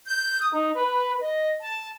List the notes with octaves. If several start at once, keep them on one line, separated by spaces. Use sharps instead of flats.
G6
D#6
D#4
B4
D#5
A5